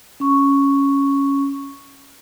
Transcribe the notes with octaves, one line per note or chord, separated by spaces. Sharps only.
C#4 C#6